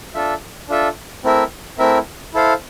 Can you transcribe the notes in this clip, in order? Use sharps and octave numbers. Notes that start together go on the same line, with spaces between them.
D4 F4 A4 E5
D4 F4 A4 E5
A3 C4 E4 A#4 E5
A3 C4 E4 A#4 E5
E4 A4 C5 F5